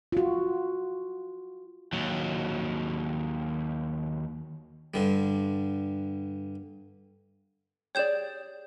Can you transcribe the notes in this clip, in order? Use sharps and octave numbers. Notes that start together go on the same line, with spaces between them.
F4 F#4
D#2 F#3
G2 D3 G3
G4 G#4 C#5 D5 G6 E7